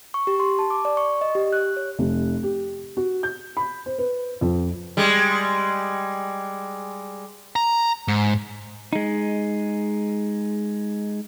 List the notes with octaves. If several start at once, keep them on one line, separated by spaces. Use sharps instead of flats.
C#6
G4
C6
A5
D6
D5
C#6
D#5
G4
F#6
C#5
F1
G4
F#4
G6
B5
C5
B4
F2
G3 G#3
A#5
G#2
G#3 D#4